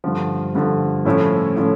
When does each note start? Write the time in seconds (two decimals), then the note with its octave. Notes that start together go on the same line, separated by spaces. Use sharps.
0.04 G2 D3 F3
0.55 G2 D3 F3
1.05 A2 F3 A3 C#4 E4
1.56 A2 F3 A3 C#4